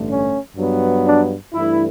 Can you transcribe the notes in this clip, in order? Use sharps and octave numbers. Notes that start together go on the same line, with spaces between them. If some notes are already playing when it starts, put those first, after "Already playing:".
Already playing: A1 G2 D3 A3
C#4
G2 F#3 B3
D4
G2 E3 A3 E4